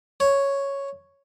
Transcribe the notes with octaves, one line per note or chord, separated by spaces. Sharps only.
C#5